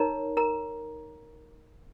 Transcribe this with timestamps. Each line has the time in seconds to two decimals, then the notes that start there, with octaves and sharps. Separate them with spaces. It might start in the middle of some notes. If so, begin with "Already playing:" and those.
Already playing: D#4 A#4 C#5 A#5
0.37 A#4 A#5